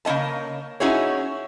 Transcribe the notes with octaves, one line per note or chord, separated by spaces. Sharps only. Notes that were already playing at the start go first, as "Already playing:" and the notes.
C#3 A#3 C#4 D#5 A5
C#4 D#4 E4 F#4 G#4 C#5